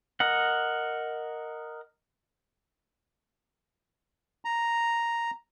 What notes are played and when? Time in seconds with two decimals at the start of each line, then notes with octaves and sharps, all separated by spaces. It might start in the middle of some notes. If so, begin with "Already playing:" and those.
0.20 A#4 D#5 F#5
4.45 A#5